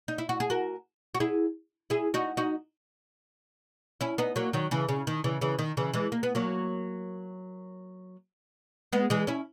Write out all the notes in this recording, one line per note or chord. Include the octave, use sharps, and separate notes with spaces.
D#4
E4
F#4
G#4
F#4 A#4
F#4
E4 G#4
E4 G#4
D#4 F#4
D#4 F#4
C#4 E4
B3 D#4
F#3 A#3
D#3 F#3
C#3 E3
C#3
D#3
C#3 E3
C#3 E3
D#3
C#3 E3
E3 G#3
A#3
B3
F#3 A#3
G#3 B3
E3 G#3
C#4 E4